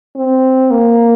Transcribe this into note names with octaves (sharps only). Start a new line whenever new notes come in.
C4
A#3